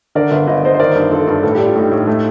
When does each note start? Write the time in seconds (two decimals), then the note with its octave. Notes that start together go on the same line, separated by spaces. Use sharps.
0.15 D3 A#4 D5
0.32 G1
0.47 G1 D#5
0.63 G1 C5 D#5
0.75 C5
0.79 D#3 A#4 D5
0.95 G2
1.11 G2 F4 A4
1.27 G2
1.43 A2 A4
1.55 D4 G4
1.66 F4
1.75 A2 D#4 G4
1.92 A2
2.07 A3